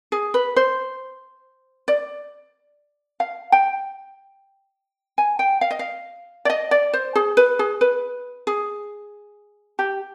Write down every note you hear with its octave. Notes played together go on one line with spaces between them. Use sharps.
G#4
B4
C5
D5
F5
G5
G#5
G5
F5
D#5
F5
D5
D#5
D5
C5
G#4
B4
G#4
B4
G#4
G4